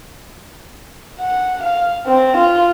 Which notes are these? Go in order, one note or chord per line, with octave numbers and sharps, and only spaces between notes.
F#5
F5
C4
F4